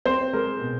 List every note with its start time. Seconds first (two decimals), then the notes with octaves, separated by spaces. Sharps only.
0.06 C4 C5
0.33 G#3 A#4
0.61 B2